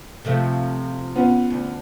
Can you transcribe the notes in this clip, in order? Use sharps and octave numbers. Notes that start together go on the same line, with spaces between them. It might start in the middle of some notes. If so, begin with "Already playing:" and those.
C3 F3 A3
B3 C#4 F4
D2